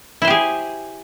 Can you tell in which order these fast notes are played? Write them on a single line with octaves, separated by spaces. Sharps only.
E4 C5 G4 G#4